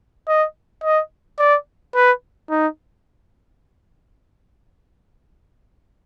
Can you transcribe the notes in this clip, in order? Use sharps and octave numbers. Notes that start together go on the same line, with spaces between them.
D#5
D#5
D5
B4
D#4